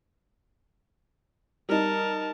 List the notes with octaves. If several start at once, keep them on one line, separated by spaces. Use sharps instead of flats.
G3 D#4 A#4 A5